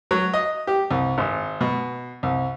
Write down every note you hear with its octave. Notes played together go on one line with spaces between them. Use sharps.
F#3
D#5
G4
C2
G#1
B2
C2